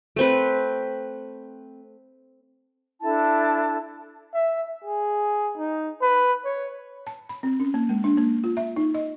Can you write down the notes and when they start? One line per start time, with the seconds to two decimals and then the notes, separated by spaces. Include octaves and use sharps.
0.16 A3 C4 B4
3.02 D4 E4 A4 A5
4.34 E5
4.84 G#4
5.57 D#4
6.02 B4
6.45 C#5
7.07 A5
7.29 B5
7.43 C4
7.60 C#4
7.74 A#3
7.89 G#3
8.04 D4
8.17 A#3
8.44 F4
8.57 E5
8.76 D#4
8.94 D#5